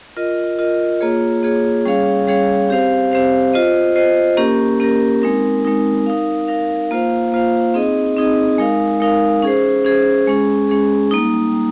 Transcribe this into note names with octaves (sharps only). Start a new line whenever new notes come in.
F4 A#4 D#5
F4 A#4 D#5
A#3 F4 G#4 C#5
A#3 F4 G#4 C#5
G3 C#4 G#4 C#5 F5
G3 C#4 G#4 C#5 F5
C4 G4 C5 F5
C4 G4 C5 F5
F4 C5 D#5
F4 C5 D#5
A#3 C#4 G4 A#4
A#3 C#4 G4 A#4
G#3 C4 D#4 A#4
G#3 C4 D#4 A#4
D#4 A#4 F5
D#4 A#4 F5
A#3 F4 C5 F5
A#3 F4 C5 F5
C4 D#4 G#4 D#5
C4 D#4 G#4 D#5
G#3 D#4 A#4 F5
G#3 D#4 A#4 F5
C#4 G#4 C5
C#4 G#4 C5
G#3 C#4 G#4
G#3 C#4 G#4
G3 A#3 D#4
G3 A#3